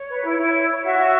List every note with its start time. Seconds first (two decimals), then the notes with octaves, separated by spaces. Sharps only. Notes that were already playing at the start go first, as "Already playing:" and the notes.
Already playing: C#5
0.09 B4
0.24 E4
0.38 E4
0.54 C#5
0.68 C#5
0.84 F#4 E5
0.98 F#4